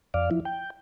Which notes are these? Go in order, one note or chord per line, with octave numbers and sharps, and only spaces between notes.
F2 D5 F5
F3 E4
G5